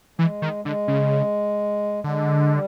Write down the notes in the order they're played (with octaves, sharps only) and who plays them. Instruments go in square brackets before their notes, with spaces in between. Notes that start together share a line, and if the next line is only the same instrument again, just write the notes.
[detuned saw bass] E3 [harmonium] G#3
[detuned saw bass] D#3
[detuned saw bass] D3 [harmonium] G#3
[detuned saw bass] C#3
[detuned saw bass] D3 [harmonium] G#3
[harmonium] G3